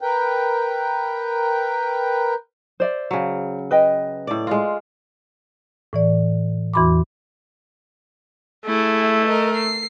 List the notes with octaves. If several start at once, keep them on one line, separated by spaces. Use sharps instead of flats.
A#4 B4 G5
C5 D5 E5
C#3 F#3
B4 D#5 G5
A2 D5
G#3 F4
A2 E3 D5
E2 E3 F#4 B5 C6 D6
A3 E4 G#4
A#4 D#5
C7